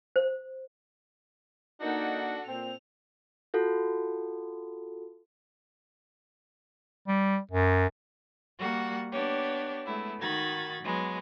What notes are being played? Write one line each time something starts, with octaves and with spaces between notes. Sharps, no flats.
C5
A#3 D4 D#4 F#4 A4 F#5
A#2 C4 F7
F4 F#4 A4
G3
F#2
G3 A#3 F#4 F#5
B3 D4 G4 C#5
G#3 A3 B3 E4
D#3 D#4 F#4 B5 G#6 A6
F#3 G#3 B3